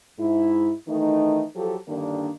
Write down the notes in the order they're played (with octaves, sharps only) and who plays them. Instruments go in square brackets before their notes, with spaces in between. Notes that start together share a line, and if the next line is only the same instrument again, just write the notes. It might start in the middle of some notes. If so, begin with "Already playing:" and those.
[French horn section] G#2 E4
D#3 E3 A3 D#4
F3 F#3 G4 A4
G2 D3 D#3 A#3 D4